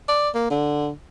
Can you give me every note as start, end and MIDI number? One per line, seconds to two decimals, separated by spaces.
0.08 0.29 74
0.34 0.49 58
0.50 0.90 50